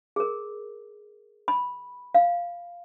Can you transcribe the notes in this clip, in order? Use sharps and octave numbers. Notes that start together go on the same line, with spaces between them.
G#4 A#4
B5
F5